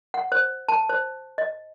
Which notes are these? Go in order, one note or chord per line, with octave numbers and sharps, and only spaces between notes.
F#5
C5
A5
C5
D#5